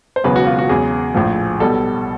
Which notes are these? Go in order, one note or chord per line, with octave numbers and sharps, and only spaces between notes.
C5
E1 E2 C#3 F#3 B4
F#4
F4
F#4
E2 C#3 F#3 G#4
A#1 A2 F3
B1 B2 G3 A4